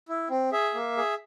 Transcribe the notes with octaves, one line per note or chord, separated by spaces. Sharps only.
E4
C4
G#4 E5
A#3
G#4